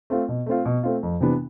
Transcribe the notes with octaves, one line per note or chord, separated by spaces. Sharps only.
A3 C4 F4
B2
A3 C4 F4
B2
A3 C4 F4
F2
C3 E3 B3 D4